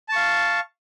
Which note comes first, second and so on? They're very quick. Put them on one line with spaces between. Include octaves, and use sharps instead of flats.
A5 C#6 F5